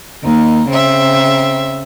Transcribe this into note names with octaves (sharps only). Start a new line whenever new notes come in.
D#2 D#4
C#3 C4 E5